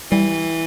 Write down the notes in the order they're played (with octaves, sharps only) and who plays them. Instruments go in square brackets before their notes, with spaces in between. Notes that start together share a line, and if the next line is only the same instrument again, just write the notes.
[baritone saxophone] E3 [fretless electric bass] G3